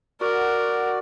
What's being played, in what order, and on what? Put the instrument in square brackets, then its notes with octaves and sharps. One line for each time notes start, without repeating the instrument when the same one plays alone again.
[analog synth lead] F#4 [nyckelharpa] A#4 [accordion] D5